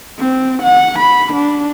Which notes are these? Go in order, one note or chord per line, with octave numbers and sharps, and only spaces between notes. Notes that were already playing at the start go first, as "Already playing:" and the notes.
C4
F#5
B5
D4